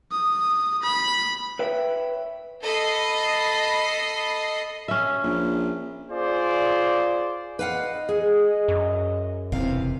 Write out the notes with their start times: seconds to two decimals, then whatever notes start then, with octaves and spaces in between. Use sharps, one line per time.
0.12 D#6
0.82 B5
1.59 B4 C#5 E5 G5
2.62 A4 D#5 B5 C7
4.88 C#4 E5
5.23 A#1
6.11 F4 G#4 C5 D5
7.59 B4 D#5 F5 F#5
8.09 G#4
8.68 F#2
9.52 E1 C3 E3 F5